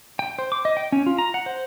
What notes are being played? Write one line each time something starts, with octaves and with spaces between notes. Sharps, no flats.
G5
C5
D6
D#5
G5
C#4
F4
A#5
F#5
C5